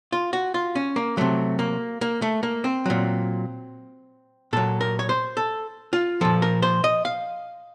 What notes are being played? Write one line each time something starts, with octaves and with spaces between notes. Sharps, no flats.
F4
F#4
F4
C#4
A#3
C3 F#3 A3
A#3
A#3
A3
A#3
C4
A#2 F#3
A#2 F#3 A4
A#4
C#5
C5
A4
F4
A#2 F3 A4
A#4
C5
D#5
F5